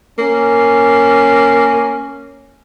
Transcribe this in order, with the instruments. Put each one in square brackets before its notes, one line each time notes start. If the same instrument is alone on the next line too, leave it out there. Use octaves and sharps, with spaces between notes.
[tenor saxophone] A#3 [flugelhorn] C#4